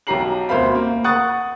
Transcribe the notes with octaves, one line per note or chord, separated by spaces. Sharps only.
B1 F#3 G4 A#5 C7 F#7
D2 B2 C5 E5 F5 B5
A#3
F#5 C#6 D#6 F#6 A6